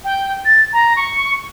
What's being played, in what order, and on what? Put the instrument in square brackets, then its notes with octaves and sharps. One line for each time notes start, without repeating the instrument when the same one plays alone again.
[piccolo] G5
A6
A#5
C#6